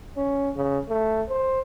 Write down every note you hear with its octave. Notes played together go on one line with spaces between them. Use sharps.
C#4
C#3
A3
C5